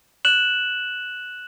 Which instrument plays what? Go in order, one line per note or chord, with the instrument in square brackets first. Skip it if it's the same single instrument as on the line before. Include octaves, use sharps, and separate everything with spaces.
[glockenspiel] F#6 E7 F#7